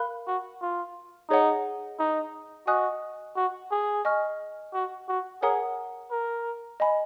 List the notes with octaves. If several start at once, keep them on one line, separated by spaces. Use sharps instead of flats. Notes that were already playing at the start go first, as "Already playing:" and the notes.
Already playing: A#4 F5 B5 F#6
F#4
F4
D#4 G#4 C#5 F#5
D#4
F#4 D#5 G#5 D#6 F#6
F#4
G#4
D#5 G#5 C#6 F6
F#4
F#4
G#4 A#4 C#5 F#5 A#5 D#6
A#4
D#5 G#5 B5